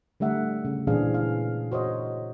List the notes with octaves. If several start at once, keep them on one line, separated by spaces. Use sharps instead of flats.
D3 G3 A3 E5 F#5
C#3
A#2 E3 C4 D4 G#4 F5
F5
F#4 C5 C#5 D#5